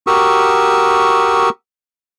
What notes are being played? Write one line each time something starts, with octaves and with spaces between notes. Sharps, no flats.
F#4 G4 A#4 C#6 D#6 E6